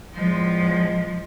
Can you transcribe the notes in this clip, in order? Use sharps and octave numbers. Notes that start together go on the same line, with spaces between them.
E2 A2 F3 G#3